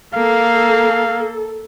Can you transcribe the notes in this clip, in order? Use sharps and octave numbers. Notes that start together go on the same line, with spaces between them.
A#3 A4 F5